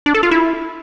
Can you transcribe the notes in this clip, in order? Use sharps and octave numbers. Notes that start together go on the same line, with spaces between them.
D4
A4
F4
E4